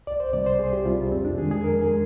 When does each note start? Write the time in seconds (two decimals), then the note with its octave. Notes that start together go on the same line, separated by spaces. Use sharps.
0.07 C2 D5
0.20 C5
0.33 C3 G3 D5
0.46 C5
0.59 C2 G#4
0.73 G4
0.85 C3 G3 F4
1.12 F2 C4
1.25 D4
1.37 D#3 G#3 G#4
1.51 G#4
1.64 F2 A#4
1.81 G#4
1.90 G#3